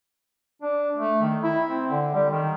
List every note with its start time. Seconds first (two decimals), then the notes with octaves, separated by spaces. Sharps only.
0.62 D4
0.97 A3
1.22 D#3
1.43 E4
1.67 C4
1.90 D3
2.14 G3
2.31 D#3